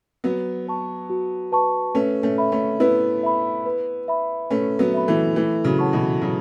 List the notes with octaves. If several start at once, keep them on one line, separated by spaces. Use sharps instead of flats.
F#3 B3 F#4
B4 A5 C#6
F#4
B4 A5 C#6
A3 C#4 B4
A3 C#4
E5 B5
A3 C#4
B3 E4 B4
E5 B5
B4
E5 B5
A3 C#4 B4
F#3 B3
E5 B5
E3 A3
E3 A3 A4
C#3 F#3
C#5 F#5 A5 C#6
B2 E3
C#3 F#3 A4